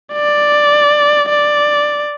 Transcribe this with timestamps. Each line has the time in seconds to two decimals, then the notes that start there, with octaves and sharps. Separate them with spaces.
0.13 D5
1.29 D5